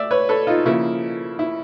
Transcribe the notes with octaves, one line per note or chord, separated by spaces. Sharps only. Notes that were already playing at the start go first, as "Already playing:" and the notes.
Already playing: A3 D5 E5
B4 C#5
A4 B4
D#4 F4
C#3 F3 A#3 E4
E4